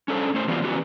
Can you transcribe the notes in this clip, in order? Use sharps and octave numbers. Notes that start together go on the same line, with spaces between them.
C#4 D4 A4 C5
A2 C#4 C5
E3 F#3 B3 F4 G4 D5
E3 F#3 B3 C#4 F#4 G4